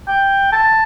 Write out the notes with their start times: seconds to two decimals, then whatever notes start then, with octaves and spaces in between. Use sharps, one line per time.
0.08 G5
0.53 A5